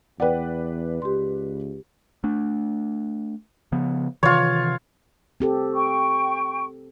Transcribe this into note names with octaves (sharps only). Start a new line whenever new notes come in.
E2 B4 D5 F#5 G5
C#2 G4 C6
A3 D4
C#3 F3 B3
C3 D#3 E3 F4 C#5
C4 G4 A4
G5 C#6